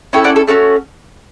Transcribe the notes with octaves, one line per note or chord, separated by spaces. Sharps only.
C#4 E4 A4 E5 G5
D5 F#5
A4
A3 C#4 F#4 A4